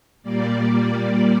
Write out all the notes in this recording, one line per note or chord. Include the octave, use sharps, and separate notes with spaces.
A#2 G3 A#3 D5